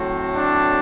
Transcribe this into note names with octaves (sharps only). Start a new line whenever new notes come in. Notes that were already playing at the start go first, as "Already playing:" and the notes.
Already playing: A2 F#3 A3 C4
D4